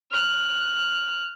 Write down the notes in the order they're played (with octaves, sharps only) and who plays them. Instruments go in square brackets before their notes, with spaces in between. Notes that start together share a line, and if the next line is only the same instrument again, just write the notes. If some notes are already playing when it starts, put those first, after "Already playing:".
[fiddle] F6 F#6